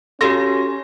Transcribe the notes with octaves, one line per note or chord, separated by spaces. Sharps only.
C#4 F#4 G4 A4 D#5 F5 C6 A#6